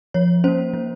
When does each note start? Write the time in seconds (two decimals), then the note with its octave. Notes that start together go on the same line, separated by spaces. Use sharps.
0.14 F3 C#5
0.44 A#3 C#4 C5
0.74 F3